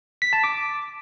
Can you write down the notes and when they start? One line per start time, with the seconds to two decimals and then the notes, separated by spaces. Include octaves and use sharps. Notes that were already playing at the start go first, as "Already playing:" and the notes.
0.22 B6
0.33 A5
0.44 D6